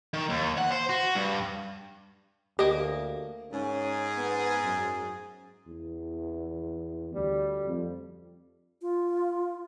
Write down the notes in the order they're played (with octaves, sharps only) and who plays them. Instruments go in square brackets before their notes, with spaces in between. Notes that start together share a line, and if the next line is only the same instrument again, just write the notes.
[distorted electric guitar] D#3
D#2
F#5
C5
F#4
G2
[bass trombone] D2 [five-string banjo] A#3 D#5 [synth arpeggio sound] G4
[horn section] G#2 G#4 [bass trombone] C#4
[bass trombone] B3
F#2
E2
[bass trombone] D2 [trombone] G3
[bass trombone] F2
[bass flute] F4